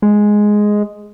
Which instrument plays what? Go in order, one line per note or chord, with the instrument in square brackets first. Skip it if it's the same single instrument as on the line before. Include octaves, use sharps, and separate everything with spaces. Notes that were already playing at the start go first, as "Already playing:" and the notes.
[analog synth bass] G#3